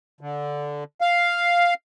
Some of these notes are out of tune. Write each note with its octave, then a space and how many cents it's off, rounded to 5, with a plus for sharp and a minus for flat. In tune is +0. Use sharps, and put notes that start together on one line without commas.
D3 -10
F5 +0